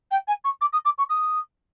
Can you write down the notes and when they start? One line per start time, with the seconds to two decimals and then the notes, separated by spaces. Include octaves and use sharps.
0.11 G5
0.28 G#5
0.44 C#6
0.61 D6
0.73 D#6
0.85 D6
0.98 C#6
1.09 D#6